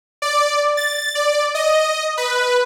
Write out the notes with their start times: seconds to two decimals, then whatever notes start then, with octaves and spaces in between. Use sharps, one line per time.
0.22 D5
0.77 A6
1.15 D5
1.55 D#5
2.17 B4